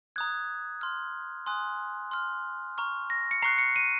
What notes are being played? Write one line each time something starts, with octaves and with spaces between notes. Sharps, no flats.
A#5 D#6 F#6 G#6
C6 F6
G#5 C6 D#6 F#6
C6 F6
A#5 C#6 F6
A#6
C#7
A#5 C#6 F#6 C7
C#7
D#7